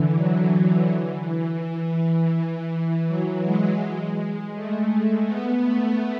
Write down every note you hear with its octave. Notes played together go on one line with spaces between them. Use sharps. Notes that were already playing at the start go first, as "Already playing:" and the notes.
Already playing: D3 E3
F#3
E3
F#3
G#3
A3
B3
A3